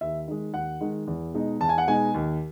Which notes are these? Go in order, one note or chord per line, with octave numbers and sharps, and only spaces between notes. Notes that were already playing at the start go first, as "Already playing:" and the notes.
D#2 E5
D#3 G#3
D#2 F#5
D#3 G#3
E2
B2 G#3 D#4
E2 A5
G#5
F#5
B2 G#3 D#4 G#5
D#2